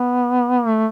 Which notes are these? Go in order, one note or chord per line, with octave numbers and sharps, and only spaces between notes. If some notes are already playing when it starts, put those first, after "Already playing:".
Already playing: B3
A3